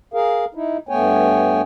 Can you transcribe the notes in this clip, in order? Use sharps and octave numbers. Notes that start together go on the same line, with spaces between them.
G#4 A#4 F5
D#4 E4
G2 A3 B3 C#5 G5 G#5